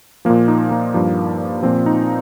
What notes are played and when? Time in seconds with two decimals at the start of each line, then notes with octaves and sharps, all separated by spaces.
0.25 A#2 F3 A#3
0.48 D#4
0.71 A#3
0.94 G2 F3
1.63 A#2 F3 C4
1.86 D#4